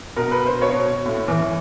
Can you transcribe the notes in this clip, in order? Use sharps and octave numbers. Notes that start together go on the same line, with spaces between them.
B2 A#4
B4
C5
B2 C#5
A2
E3